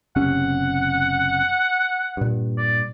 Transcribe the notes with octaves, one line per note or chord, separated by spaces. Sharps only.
F#1 C3 C#4 F#5
G2 A#2
D5